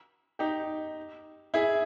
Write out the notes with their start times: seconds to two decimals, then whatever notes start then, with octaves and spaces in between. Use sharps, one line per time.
0.39 D#4 G4
1.54 E4 G#4